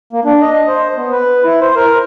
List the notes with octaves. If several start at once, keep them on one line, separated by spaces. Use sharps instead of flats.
A#3
D4
D#5
C5
B3
B4
E4
C5
A#4